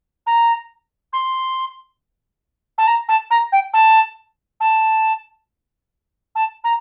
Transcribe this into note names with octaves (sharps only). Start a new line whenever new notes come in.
A#5
C6
A5
A#5
A5
A#5
G5
A5
A5
A5
A#5